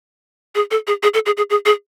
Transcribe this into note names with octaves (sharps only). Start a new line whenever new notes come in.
G#4
A4
G#4
G#4
A4
G#4
G#4
G#4
G#4